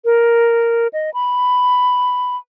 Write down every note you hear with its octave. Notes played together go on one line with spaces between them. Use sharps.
A#4
D#5
B5